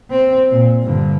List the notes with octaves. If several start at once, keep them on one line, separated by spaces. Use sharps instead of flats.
C4
A#2
G2 D3